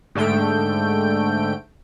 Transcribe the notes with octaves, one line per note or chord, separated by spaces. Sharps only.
G#2 D3 A3 G5 D7